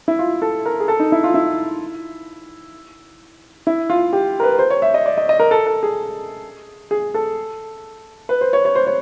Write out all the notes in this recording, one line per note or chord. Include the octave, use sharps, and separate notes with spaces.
E4
F4
A4
A#4
G#4
A4
D#4
E4
F4
E4
E4
F4
G4
A#4
B4
C5
C#5
E5
D#5
D5
D#5
D#5
A#4
A4
A4
G#4
G#4
A4
B4
C5
C#5
C#5
C5
C#5